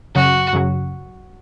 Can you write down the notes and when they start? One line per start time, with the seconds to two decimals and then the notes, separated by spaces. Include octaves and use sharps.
0.15 F#2 C#3 F#3 F#4
0.53 F#2 C#3 F#3